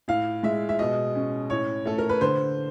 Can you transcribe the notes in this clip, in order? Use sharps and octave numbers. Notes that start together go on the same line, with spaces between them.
A2 F5
G#3 E5
E5
B2 D#5
C#4
A2 C#5
A3 A4
A#4
B4
D3 C5